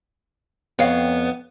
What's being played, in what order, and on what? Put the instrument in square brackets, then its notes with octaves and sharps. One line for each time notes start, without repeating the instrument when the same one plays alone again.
[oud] F2 C#5 F5 [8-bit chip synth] B3